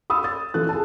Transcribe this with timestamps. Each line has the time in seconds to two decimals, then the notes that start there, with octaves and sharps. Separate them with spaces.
0.10 B5 D#6 E6
0.24 E6 A6
0.54 E3 A4 F#6
0.69 G#4 A5